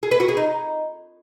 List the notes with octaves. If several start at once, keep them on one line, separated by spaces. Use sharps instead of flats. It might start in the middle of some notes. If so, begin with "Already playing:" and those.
G#4
B4
F#4
G#4
D#4